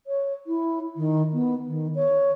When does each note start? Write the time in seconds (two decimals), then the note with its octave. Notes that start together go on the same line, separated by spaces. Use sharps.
0.07 C#5
0.47 E4
0.96 D#3
1.33 B3
1.68 D#3
1.95 C#5